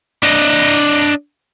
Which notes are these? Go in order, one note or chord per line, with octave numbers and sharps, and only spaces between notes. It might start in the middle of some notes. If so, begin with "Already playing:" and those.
D4 D#5